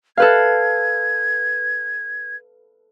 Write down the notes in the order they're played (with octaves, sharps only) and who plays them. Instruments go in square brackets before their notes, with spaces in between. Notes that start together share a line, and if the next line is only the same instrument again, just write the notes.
[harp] A4 B4 F5 [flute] G#6